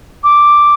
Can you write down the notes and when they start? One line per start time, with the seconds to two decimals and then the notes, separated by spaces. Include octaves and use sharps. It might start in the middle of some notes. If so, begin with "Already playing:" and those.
0.24 D6